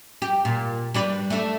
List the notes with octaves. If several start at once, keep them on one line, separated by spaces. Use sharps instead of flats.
G4
A#2
G3 D4 B4
A3 D4